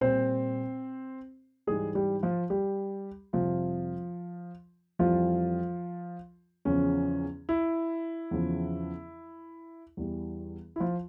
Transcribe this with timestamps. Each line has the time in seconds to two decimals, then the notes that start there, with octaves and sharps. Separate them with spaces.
0.01 A#2 G3 C4 C5
1.67 G#2 E3 G3 G#3 G#4
1.95 G3 G4
2.23 F3 F4
2.50 G3 G4
3.33 F2 C3 F3 G3 F4
4.99 F2 E3 F3 G3 F4
6.65 E2 C#3 F3 C#4
7.49 E4
8.31 E2 C#3 F3
9.97 E2 E3 G3
10.76 E4
10.80 F3 F4